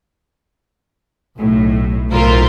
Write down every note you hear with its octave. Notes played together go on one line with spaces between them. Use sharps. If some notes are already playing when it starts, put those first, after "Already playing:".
B1 A2
B1 A2 F4 A#4 C5